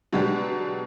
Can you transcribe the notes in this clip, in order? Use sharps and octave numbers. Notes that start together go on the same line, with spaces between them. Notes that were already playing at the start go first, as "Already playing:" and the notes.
B2 F#3 G#3 D4 G4